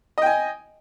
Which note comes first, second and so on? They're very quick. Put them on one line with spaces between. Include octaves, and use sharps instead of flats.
D#5 G5 G#5